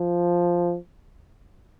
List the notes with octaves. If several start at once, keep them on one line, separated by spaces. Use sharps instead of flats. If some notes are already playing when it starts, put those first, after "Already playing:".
Already playing: F3